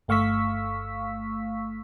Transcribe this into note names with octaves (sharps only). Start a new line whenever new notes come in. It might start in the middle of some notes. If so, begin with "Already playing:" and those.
G1 A3 F5 C#6 E6 B6